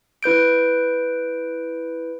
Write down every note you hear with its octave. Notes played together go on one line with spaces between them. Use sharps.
E4 B4 G6 D7